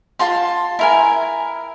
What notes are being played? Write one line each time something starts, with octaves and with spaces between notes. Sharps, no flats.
F4 A5 C6
E4 A#4 G#5